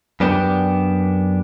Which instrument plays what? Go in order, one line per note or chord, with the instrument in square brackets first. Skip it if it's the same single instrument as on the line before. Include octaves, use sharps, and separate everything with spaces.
[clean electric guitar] F#2 B3 D4 G4